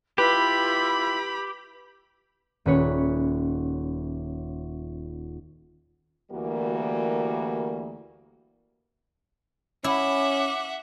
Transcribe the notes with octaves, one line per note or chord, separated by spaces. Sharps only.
E4 F4 G4 B4 B5
D#1 C#4 B4 C#5
D2 E3 G3 A#3 F#4 A#4
C#4 E4 E5 F#5 D6